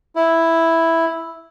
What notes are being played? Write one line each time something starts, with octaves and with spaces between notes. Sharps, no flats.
E4